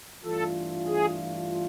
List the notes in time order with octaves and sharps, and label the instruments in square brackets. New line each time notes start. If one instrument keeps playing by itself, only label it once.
[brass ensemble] G2 E3 A3 D4 F4 [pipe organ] A4
[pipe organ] G#4